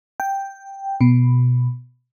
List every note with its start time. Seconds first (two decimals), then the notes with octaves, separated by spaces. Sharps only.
0.20 G5
1.01 B2